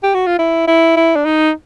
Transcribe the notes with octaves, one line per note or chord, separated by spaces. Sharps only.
G4
F#4
F4
E4
E4
E4
D4
D#4